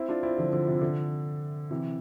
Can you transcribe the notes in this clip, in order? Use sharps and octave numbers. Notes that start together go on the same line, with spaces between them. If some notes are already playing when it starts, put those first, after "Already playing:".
Already playing: C4 E4
D4 F4
C4 E4
D3 F3
D3
C3
D3
C3 E3